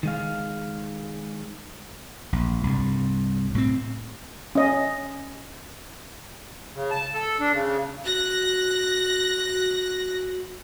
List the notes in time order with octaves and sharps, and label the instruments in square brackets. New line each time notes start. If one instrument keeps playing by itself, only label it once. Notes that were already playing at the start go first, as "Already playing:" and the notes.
[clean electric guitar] D#3 G#3 F5
[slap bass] A#1
C2 G2
A2 G3 C4
[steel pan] C#4 D#5
[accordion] C#3
A5
A4
D4
C#3
[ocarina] F#4 [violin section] F#6 A#6